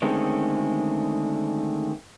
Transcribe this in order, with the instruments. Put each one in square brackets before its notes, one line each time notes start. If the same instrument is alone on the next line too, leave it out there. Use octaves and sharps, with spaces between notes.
[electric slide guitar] D3 D#3 G#3 A3 C4 C#4